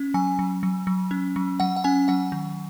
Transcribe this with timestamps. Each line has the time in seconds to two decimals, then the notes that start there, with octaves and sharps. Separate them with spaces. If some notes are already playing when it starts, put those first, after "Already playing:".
Already playing: C#4
0.14 F#3 G#5
0.39 F#3
0.63 F#3
0.87 F#3
1.11 C#4
1.36 F#3
1.60 F#3 F#5
1.76 F#5
1.84 C#4 G#5
2.08 F#3 F#5
2.32 D#3